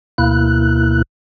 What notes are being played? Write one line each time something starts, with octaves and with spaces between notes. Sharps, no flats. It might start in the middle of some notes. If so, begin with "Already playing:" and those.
D2 B2 A#3 E4 F#6